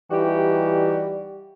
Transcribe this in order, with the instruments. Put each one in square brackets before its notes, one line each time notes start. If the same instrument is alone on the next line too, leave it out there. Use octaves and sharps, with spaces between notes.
[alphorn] E3 [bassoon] G3 [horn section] D#4 F#4 G4